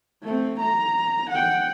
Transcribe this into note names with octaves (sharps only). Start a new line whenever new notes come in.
A3 C4
A#5
F#5 G5